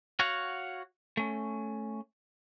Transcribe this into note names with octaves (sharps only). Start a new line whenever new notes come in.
F#4 C#5 F5 F#5
A3 C#4